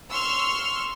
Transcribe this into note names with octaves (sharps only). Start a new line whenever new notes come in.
C6 C#6 E6 F6